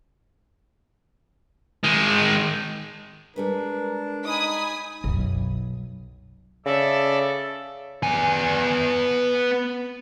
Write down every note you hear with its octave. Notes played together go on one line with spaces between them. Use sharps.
D#3 G#3
G3 G#3 D4 A#4 B4
D#4 G#5 B5 D#6
B1 F#2
C#3 A4 D5 E5
B3 G#5